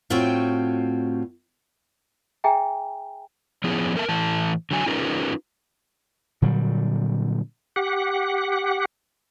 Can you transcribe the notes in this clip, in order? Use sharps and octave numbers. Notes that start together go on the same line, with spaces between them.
A2 C4 F4 F#4 C#5 G5
G#4 E5 G5 G#5 A#5
F3 B3 C#4 E4 G#4
A4 A#4 E5 A5
A2 E3 A3 A5
D3 F#3 G#5
C#4 D#4 F4 G#4 A#4 B4
A#2 D3 F#3 G3
G4 F#5